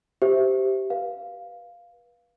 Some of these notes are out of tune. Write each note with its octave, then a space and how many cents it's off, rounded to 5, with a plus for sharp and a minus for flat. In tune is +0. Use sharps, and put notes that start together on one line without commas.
G4 -10 C5 -15 E5 +0
B4 -20 F5 +0